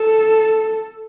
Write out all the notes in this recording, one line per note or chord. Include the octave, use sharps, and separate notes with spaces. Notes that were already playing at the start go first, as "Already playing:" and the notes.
Already playing: A4